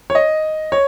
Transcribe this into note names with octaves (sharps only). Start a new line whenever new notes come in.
C#5
D#5
C#5